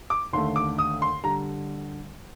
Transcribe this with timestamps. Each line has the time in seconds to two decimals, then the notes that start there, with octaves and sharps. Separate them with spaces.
0.10 D6
0.33 D#2 D3 A3 C6
0.56 D6
0.78 D#6
1.02 C6
1.23 D3 G3 A#5